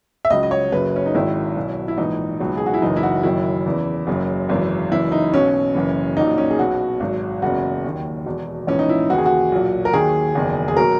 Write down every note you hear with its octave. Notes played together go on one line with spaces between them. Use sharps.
E5
C#2 C#3 F#3 D#5
D#5
C#5
F#1 F#2 C#3 F#3 B4
C#4
D#4
G#1 G#2 D#3 F#3 E4
B1 B2 F#3
E4
A#1 G#2 E3 D#4
C#2 B2 F#3
G#4
F#4
E4
F#1 F#2 E3 D#4
E4
F#4
F#1 F#2 D#3 F#3 E4
E2 C#3 E3
F#1 F#2 C#3 F#3
G#1 F#2 C#3 E3
F#1 F#2 E3 E4
D#4
B1 B2 F#3 C#4
F#1 F#2 E3
A#1 A#2 F#3 D#4
C#4
G#4
B1 B2 F#3 F#4
G#1 G#2 F#3
F#1 E2 C#3 F#3 F#4
D#2 D#3 F#3
E1 E2 B2
A#1 G#2 E3 C#4
D#4
E4
D#2 C#3 E3 F#4
G#4
F#4
B1 A#2 F#3
A#4
D#2 D#3 F#3 G#4
F#1 E2 D#3
G#4
B2 F#3 A#4